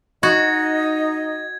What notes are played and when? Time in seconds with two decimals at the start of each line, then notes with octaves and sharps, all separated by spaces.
0.23 D#4 F#4 D#5 G#6